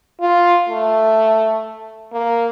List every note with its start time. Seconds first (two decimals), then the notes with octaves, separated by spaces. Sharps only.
0.21 F4
0.69 A3
2.13 A#3